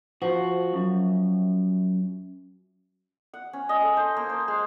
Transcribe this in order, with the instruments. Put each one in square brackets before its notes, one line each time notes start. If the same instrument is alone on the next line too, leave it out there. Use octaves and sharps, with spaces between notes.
[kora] F3 [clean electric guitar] F#4
[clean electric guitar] F#2
[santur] F#5
C#4
D#5
A4
C5
A#3
C5
G#3